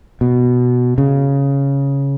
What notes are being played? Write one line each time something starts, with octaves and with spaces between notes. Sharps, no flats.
B2
C#3